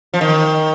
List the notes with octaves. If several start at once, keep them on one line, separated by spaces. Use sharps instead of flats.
F3
D#3